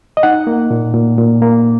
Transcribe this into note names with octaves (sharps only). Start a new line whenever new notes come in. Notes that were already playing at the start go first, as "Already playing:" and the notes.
D#5
D#4 F#5
A#3
A#2
A#2
A#2
A#3